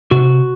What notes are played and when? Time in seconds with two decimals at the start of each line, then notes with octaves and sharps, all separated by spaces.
0.11 C3 F#4